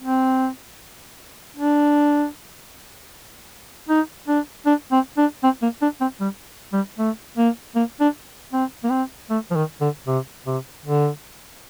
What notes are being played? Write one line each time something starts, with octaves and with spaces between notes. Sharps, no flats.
C4
D4
D#4
D4
D4
C4
D4
C4
A#3
D4
C4
G3
G3
A3
A#3
A#3
D4
C4
A#3
C4
A3
F3
D#3
D3
C3
C3
D3